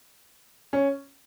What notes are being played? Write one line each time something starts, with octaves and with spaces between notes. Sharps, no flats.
C#4